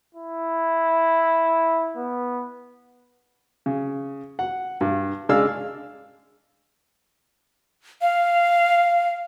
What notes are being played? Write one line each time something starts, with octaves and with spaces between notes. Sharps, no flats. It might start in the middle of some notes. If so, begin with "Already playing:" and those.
E4
B3
C#3
F#5
G2
C#3 G#3 D4 F5 E6 F6
F5